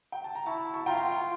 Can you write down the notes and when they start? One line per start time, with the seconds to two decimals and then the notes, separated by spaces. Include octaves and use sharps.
0.12 G5
0.24 A5
0.35 A#5
0.46 E4 A5 C#6
0.73 A5 C#6
0.86 F4 G5 A#5